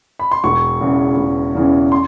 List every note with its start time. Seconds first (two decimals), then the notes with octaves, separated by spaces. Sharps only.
0.19 B5
0.31 C6
0.44 E1 C#6
0.81 E2 C#3 E3
1.18 E1
1.55 E2 C#3 E3
1.92 C6